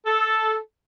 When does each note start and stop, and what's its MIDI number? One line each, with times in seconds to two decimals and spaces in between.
0.06 0.57 69